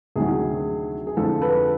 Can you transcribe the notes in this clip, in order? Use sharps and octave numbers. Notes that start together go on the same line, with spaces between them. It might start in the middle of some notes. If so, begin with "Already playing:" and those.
D2 C3 D#3 F#3 G#4
G#4
F2 D3 F3 A4
A4 B4